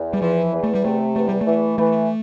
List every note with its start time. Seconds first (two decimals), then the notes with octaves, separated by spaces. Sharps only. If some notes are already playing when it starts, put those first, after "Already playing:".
Already playing: E2
0.13 G3
0.22 E3 F3
0.53 E2
0.63 A3
0.75 G3
0.84 C3 A3
1.15 E2 A3
1.29 G3
1.41 A3
1.47 E3
1.78 E3 A3